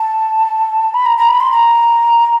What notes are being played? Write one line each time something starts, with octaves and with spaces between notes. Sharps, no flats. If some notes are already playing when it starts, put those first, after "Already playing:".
Already playing: A5
B5
A#5
A#5
B5
C6
A#5